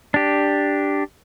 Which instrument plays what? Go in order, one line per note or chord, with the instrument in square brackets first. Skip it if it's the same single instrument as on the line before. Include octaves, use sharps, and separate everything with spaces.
[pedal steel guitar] D4 G4